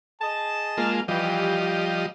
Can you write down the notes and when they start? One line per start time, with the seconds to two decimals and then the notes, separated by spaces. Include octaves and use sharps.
0.22 G#4 D#5 A5
0.77 G#3 A#3 F4
1.08 E3 F3 G3 G4 D#5
1.61 G4